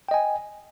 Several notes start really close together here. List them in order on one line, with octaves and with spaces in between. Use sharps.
G5 D#5 G#5